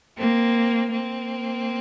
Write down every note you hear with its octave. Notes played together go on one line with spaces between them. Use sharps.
A#3 C4
A#3 C4